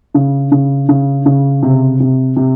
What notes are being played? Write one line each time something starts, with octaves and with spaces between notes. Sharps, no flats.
C#3
C#3
C#3
C#3
C3
C3
C3